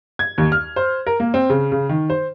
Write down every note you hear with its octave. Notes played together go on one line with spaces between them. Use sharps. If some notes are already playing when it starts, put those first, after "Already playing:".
G#6
D#2
F6
C5
A#4
A#3
C4
C#3
C#3
D#3
C5